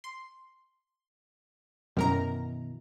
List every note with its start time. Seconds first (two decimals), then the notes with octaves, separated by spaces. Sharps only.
0.04 C6
1.97 F#2 B2 D#3 E3 A#4 A#5